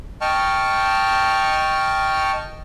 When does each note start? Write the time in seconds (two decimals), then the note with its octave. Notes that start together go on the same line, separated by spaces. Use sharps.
0.21 D#5 G5 A5 C#6 F6